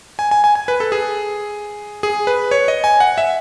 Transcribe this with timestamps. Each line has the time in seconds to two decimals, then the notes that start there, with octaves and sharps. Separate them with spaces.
0.19 G#5
0.31 G#5
0.44 G#5
0.55 G#5
0.68 B4
0.80 A4
0.92 G#4
2.03 G#4
2.27 B4
2.51 C#5
2.68 D#5
2.84 G#5
3.00 F#5
3.18 E5